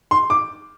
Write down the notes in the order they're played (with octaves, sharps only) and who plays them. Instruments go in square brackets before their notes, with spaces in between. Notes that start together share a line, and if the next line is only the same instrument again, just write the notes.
[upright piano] C6
D6